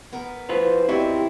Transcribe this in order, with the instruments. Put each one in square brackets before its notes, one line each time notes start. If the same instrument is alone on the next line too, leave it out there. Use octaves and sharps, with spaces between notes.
[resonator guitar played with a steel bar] B3 A#4
[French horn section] F3 E4 C5 [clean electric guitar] F4 B4
[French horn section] E2 D#3 C4 [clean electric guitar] E4 [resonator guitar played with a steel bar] F#4 D5 D#5 [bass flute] G4